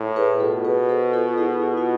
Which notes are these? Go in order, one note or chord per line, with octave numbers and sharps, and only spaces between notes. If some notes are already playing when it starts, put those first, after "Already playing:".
Already playing: A2
G#4 B4
B2 F4 A4
G#4 B4
A4 C5
F4 A4
E4 G#4
F4
F4